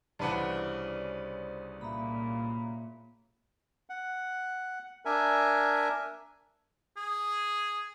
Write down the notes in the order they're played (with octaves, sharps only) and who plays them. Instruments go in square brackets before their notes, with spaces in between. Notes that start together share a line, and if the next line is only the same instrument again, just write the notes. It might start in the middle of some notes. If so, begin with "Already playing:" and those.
[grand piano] C2 B4 F#5 [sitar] C#3 E3 D4 [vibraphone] C5
[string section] A#2 [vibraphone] E5 A#5 B5
[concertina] F#5
D4 A#4 E5 G#5
[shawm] G#4